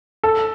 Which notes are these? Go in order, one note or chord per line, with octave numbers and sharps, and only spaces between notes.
A4